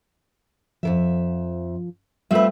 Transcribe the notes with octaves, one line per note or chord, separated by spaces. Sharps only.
F2 D#3 F3 E5
G3 A3 C4 F4 B4 E5